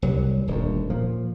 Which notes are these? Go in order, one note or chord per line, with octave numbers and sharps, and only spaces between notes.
C2 F#3 G3
D#1 D2
A#2 F3